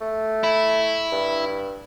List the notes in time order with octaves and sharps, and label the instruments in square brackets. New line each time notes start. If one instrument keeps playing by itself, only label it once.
[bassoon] A3
[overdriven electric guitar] E4
[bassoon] G2